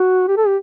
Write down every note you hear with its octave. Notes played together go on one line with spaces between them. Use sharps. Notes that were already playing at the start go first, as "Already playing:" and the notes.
Already playing: F#4
G4
A4
G4